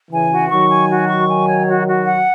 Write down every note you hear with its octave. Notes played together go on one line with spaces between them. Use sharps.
C#3 E3 G#5
F#4
D#3 F#3 C#6
G#5
F#4
C#6
G#5
C#5
F#4
F#4
F#5